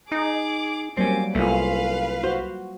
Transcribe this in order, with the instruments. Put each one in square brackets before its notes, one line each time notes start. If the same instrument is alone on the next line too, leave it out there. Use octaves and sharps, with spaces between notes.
[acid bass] D#4 [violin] G#4 D6
[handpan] F#3 G3 A#3 [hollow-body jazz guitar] C4 C#4 [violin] D6
[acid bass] C2 [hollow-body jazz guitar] A3 C#4 [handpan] A#3 F4 [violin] B4 F5
[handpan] F#4 [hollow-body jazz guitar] C5